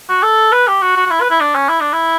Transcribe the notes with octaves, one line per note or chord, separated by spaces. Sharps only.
F#4
A4
B4
G4
F#4
F#4
F#4
E4
B4
E4
D4
C#4
E4
D4
E4